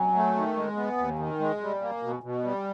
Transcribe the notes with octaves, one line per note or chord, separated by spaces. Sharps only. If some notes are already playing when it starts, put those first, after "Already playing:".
Already playing: F#3 G#5
A3
D#3
G#3
B3
D#2
D#3
G#3
G3
A#3
B2
B2
G3